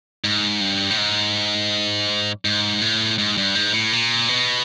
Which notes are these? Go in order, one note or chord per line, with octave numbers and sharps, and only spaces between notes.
G#2
G2
A2
G#2
G#2
A2
G#2
G2
G#2
A2
A#2
B2